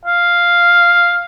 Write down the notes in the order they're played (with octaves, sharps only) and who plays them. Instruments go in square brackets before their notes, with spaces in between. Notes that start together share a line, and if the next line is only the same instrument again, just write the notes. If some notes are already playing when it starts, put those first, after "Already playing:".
[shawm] F5